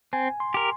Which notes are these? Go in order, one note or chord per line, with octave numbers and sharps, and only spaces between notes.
C4 G#5
C6
G4 A#4